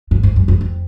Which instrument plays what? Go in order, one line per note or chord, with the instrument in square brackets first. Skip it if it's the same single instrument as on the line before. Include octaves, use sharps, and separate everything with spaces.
[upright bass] G#2
G#2
F#2
F2
F2